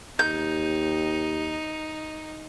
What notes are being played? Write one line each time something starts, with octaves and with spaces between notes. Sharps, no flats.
D#2 D#4 G6